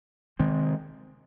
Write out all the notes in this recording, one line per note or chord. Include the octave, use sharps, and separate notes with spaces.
C3 D#3 G#3 C4